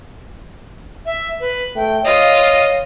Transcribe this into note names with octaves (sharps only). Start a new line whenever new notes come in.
E5
B4
A3 G5
F4 C#5 D#5